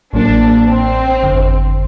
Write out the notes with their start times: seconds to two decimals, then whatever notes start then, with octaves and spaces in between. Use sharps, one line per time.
0.13 A1 A2 F#3 A#3 D4
0.67 C4
1.22 G1 F2 D3